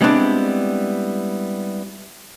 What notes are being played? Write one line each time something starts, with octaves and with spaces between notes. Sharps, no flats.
G3 G#3 B3 C4 D4 E4